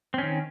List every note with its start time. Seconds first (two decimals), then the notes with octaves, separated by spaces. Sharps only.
0.14 C4
0.18 C#4
0.23 D#3